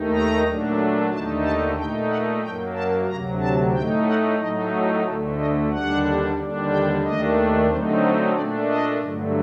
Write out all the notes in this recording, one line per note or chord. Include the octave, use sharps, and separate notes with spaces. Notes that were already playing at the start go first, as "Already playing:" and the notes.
Already playing: D#2 D#3 A3 D#4
A#5
A#2 F#3 A3 D4
D#2 D3 A3 D#4 A5
A5
A#2 A3 D#4 G5
F#5
F#2 F#3 A#3 G5
A5
D2 C3 F#3 A#5
A5
A2 A3 D#4 G5
F#5
A2 F#3 A3 D#4 D#5
F#4
D2 D3 A3 A4
D#5
D#2 D3 G3 D4 F#5
D#2 D3 G3 D4
G5
D#2 D#3 A3 D4 D#5
D3 F#3 A3 C4 D#4 C5
C5
A#2 A3 D4 D5
D#5
G2 D3 F#3 A3